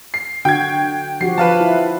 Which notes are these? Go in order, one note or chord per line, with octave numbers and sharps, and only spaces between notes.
C7
D3 F#4 G5 G#6
F3 F#4 G4 C7
F3 B4 F5 A5
E4